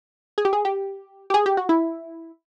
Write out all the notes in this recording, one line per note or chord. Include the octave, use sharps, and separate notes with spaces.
G#4
G4
G#4
G4
G4
G#4
G4
F#4
E4